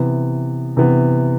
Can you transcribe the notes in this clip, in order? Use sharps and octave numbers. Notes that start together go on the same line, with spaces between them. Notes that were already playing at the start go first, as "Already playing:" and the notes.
Already playing: C3 E3 B3
C3 E3 B3